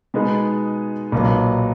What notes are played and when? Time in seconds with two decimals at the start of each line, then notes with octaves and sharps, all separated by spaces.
0.14 B2 G#3 B3 D#4 G#4
1.12 B1 A#2 F#3 B3